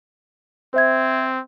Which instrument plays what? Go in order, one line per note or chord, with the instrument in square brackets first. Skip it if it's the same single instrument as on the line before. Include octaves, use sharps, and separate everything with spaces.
[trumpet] C4 [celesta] C5 E5 G#6